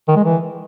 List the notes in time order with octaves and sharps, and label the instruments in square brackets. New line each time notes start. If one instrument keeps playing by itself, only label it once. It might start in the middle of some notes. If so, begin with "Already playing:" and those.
[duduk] D#3
G#3
E3